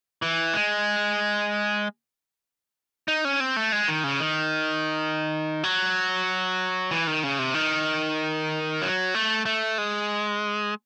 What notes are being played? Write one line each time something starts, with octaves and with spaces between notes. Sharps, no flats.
E3
G#3
D#4
C#4
C4
A3
G#3
D#3
C#3
D#3
F#3
E3
D#3
C#3
C3
D#3
F#3
A3
A3
G#3